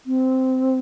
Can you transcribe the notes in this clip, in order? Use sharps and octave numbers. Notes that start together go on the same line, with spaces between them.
C4